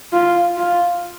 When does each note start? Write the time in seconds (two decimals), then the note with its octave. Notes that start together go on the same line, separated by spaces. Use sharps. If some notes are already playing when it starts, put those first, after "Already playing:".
0.12 F4
0.57 F4